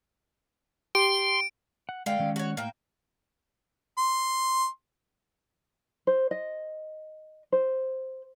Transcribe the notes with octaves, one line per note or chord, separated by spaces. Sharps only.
G4 C6 D7
F#5
D3 G#3 F5 G5
D#3 G#3 C#4
F#4 C#5
A2 A#3 G5
C6
C5
D#5
C5